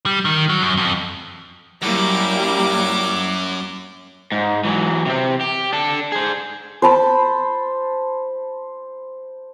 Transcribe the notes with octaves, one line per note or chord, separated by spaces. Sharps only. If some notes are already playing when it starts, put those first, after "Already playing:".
G3
D#3
F#3
F#2
F2
F#2 F#3 G3 A#3 E4 G4 D6
G#2
E3 F#3
C3 C4
G4
D4 A4
G#4 C5
C5 A5 B5